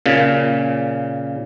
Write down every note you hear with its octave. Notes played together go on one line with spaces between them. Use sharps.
A#2 C#3